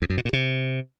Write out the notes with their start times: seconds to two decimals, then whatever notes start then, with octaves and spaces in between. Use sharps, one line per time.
0.02 E2
0.10 F#2
0.17 B2
0.25 A#2
0.33 C3